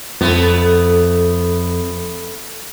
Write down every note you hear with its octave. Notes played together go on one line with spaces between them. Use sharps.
F2 A3 B3